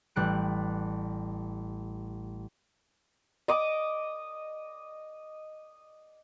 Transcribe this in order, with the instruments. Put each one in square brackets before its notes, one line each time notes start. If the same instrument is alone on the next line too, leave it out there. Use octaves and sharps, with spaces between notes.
[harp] A1 G3 F#6 D7
[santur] D#5 D6